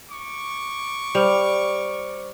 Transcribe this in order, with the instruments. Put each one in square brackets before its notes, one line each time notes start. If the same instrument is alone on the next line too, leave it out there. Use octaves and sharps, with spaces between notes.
[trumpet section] C#6 D6
[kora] G3 [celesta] C5 F6 F7